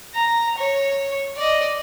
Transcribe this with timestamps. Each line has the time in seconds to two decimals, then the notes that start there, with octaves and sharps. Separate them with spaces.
0.15 A#5
0.58 C#5
1.37 D5 D#5